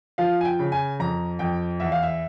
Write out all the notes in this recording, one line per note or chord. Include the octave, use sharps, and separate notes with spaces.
F3 F5
G#5
G5
C#3
G#5
F2 A#5
F2 G5
E2 E5
F5
E5